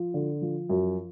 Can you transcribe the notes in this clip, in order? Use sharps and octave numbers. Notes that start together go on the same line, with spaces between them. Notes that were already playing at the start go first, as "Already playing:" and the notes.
Already playing: F3
D3
F3
F#2